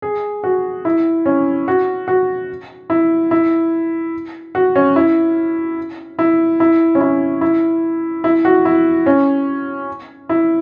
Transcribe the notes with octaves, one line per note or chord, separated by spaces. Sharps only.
G#4
F#4
E4
C#4
F#4
F#4
E4
E4
F#4
C#4
E4
E4
E4
C#4
E4
E4
E4
F#4
E4
C#4
E4